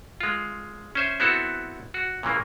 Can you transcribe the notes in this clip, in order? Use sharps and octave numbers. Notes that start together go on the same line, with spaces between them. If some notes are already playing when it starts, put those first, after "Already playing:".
G#3 F4
C#4 C5 E5
B3 C4 E4 F#4 A4
F#4
A#2 C#3 E3 A#3